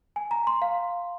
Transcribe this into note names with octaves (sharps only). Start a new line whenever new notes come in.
G#5
A#5
C6
F5